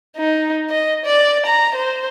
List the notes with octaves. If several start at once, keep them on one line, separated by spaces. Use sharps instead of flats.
D#4
D#5
D5
A#5
C5